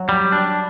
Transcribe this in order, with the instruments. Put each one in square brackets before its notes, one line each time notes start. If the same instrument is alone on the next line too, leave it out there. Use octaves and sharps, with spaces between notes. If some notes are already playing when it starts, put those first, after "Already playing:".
Already playing: [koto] F#3
[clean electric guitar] G3
D4